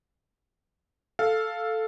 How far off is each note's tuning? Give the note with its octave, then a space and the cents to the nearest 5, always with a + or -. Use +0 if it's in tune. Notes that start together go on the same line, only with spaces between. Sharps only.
A4 +0 F5 +0